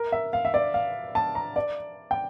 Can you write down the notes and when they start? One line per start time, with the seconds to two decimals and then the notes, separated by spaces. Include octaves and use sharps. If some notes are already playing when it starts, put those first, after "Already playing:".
Already playing: A#4
0.12 E5
0.33 F5
0.45 E5
0.54 D5
0.74 F5
1.15 A5
1.35 A#5
1.56 D5
2.11 G5